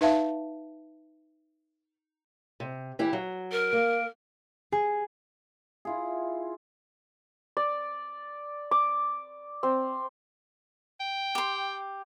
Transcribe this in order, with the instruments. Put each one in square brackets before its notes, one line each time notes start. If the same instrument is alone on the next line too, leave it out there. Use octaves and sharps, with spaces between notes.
[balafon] D#4 B4 E5 F5 A5
[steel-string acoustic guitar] C3
E3 E4 G4
F#3
[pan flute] A#4
[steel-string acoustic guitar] A#3
[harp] G#4
[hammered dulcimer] E4 F4 G#4
[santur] D5
D6
C4
[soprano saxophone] G5
[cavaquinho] G4 C6